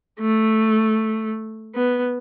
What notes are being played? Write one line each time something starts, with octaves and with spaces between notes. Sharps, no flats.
A3
B3